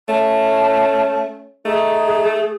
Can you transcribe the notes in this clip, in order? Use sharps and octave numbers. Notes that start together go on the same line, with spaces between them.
A3 C#4 A5
A3 D#4 G#4